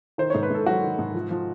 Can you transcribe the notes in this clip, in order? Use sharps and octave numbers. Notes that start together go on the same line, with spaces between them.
D#3 C5
G#2 C#5
B4
G#2 A4
F#3 F#4
D#3
G#2
F3
F3